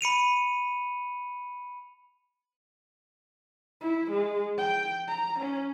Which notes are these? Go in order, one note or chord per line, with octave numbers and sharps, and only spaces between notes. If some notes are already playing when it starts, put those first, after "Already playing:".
B5 C#7 D#7 F7
E4
G#3
G5
A#5
C#4